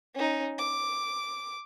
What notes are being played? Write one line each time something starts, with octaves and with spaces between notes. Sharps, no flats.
C#4 D#4
D6